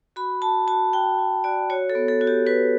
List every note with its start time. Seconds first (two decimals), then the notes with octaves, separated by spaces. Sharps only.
0.16 F#4 B5
0.42 F#4 A5
0.68 F#4 A5
0.93 F#4 G5
1.19 F#4
1.44 F#4 D5
1.70 F#4 C#5
1.90 A4
1.95 B3
2.08 A4
2.21 F#4
2.27 G4
2.46 F#4 B4